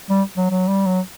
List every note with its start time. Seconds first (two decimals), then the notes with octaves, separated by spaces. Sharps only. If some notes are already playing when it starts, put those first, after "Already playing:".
0.10 G3
0.37 F#3
0.50 F#3
0.68 G3
0.86 F#3